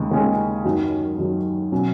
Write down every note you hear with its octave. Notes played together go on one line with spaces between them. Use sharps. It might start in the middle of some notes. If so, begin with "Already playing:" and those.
Already playing: D#2 C#3 G#3
D#2 C#3 G#3 C#4 G#4
F#2 D#3 F#3
F#2 D#3 F#3
B2 F#3 C#4